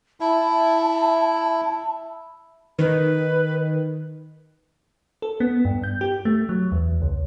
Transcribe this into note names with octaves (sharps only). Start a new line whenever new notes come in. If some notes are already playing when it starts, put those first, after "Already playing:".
E4 E5 A5 B5 E6
D#3 B4
A4
B3
G2
G6
G4
A3
F#3
E2
C#2